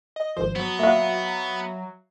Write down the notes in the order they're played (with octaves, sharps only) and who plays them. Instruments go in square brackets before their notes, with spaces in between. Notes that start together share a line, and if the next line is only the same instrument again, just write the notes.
[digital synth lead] D#5
[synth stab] G#1 F3 [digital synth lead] C5
[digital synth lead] F#3 [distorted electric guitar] B3
[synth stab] A#2 F#4 [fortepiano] E5 F5